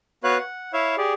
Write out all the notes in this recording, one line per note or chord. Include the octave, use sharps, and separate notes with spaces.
B3 F#4 B4 C#5 F5 F#6
F#5
E4 C#5 E5 F5
G4 G#4 D5